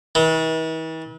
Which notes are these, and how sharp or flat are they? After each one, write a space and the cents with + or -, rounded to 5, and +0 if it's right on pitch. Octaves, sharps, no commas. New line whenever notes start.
E3 -45